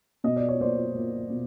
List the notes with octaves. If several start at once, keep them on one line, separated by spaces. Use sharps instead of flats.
B2 D#5
D5
C#5
A#3 C5 D5
A#3
B2